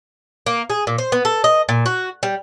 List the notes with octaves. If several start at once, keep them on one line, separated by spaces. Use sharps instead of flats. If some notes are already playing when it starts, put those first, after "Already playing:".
A#3
G#4
A#2
C5
B3
A4
D#5
A#2
F#4
G3